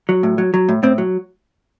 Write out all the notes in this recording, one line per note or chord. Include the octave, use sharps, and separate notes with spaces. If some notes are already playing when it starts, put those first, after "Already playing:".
F#3
A2
F#3
F#3
A2
A2 C4
F#3